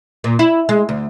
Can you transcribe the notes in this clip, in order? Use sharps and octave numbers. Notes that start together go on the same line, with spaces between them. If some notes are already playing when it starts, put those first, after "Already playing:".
A#2
E4
G#3
D2